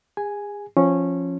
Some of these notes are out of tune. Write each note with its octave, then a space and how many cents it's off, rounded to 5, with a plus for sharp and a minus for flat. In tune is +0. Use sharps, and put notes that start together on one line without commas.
G#4 -35 G#5 +0
F3 +5 C#4 -15